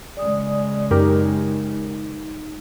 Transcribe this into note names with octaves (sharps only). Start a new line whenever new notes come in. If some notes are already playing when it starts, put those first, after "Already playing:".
C#3 G#3 D5 D#6
F#2 D#4 G4 A#4